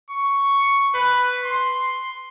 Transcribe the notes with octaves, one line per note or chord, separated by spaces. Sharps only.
C#6
B4
C6